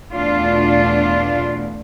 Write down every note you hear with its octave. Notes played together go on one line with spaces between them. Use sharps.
E2 B2 A3 D4 F4